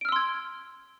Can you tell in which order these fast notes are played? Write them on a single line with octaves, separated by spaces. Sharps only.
D7 F6 E6 C6 G#6